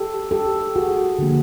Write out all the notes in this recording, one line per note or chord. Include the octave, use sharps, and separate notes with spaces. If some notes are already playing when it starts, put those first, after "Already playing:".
Already playing: G4 A4
G4 A4
F#4 G#4
D3 F3 A#3